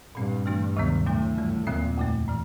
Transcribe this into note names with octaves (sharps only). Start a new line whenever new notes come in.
G2 A#2 G3 C4
E3 A3 D4 F#4
D2 C3 D#3 F#3 B3
F#2 A2 C#3 F#3 A3 D4
G2 E3 G3
D#2 A#2 D3 F3 G#3 C4
F2 C#3 F3 A3
A2 E3